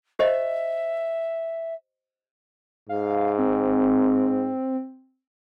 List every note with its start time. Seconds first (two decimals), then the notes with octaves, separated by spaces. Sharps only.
0.19 G4 C5 D#5 E5
2.89 G#2 F5
3.38 C4